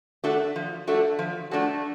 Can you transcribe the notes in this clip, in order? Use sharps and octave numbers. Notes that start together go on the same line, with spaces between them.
A3 D4 F#4 A4
F3
A3 D4 F#4 A4
F3
A3 D4 F#4 A4